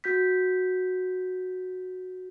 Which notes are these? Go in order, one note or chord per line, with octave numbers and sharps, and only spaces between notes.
F#4 G6 B6